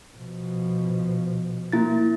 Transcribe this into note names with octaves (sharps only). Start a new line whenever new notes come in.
B2 F3
A#3 E4 A6